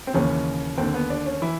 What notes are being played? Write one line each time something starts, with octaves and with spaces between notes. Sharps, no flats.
C4
D#2 C#3 E3 C#4
D#2 D3 C4
B3
D4
C#4
E3 E4